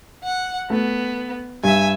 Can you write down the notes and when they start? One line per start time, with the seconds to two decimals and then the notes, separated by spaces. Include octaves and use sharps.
0.24 F#5
0.70 A3 B3
1.64 G2 E5 G#5